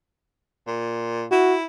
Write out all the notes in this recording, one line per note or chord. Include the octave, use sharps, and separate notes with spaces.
A#2
E4 F#4